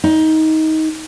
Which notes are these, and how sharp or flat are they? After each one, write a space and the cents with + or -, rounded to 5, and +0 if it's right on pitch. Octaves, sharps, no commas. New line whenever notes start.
D#4 +20